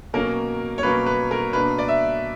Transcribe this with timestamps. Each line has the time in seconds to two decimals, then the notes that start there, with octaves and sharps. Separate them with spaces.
0.13 B2 F#3 A#3 C#4 A#4
0.78 C#5
0.83 B2 F#3 A#3 C#4 B4
1.06 B4
1.31 A#4
1.53 B2 A#3 D4 B4
1.79 D5
1.88 E5